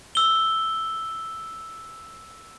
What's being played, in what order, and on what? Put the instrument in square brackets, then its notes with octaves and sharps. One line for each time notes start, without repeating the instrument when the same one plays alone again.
[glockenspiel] E6 G7